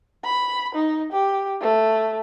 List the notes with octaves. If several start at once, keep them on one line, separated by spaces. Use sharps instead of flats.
B5
D#4
G4
A3